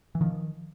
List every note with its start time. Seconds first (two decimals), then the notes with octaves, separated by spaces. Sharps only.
0.15 E3
0.21 D#3 F3